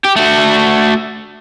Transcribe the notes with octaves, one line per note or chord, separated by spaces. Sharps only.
G4
A3 F#4